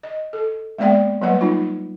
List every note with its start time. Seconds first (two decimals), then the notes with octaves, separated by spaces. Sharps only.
0.03 D#5
0.33 A4
0.79 G#3 A#3 B3 D5 E5 G5
1.21 F#3 G3 A#3 B4 F#5
1.41 D#4 F4